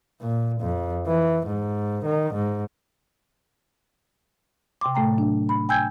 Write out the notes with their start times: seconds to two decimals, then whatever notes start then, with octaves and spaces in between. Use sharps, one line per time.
0.21 A#2
0.61 F2
1.07 E3
1.47 G#2
2.05 D#3
2.34 G#2
4.81 C3 G5 C6 D6
4.95 A2 A3 G5 A#5
5.14 F#3 D4
5.49 B5
5.69 G5 G#5 E6 G6 G#6